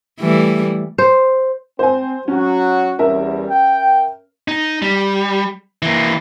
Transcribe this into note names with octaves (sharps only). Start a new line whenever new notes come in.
E3 G3 A3
C5
C4 C5 G#5
F#3 C#4 F#4
E2 G3 C#4 A#4 E5
G5
D#4
G3
E3 A#3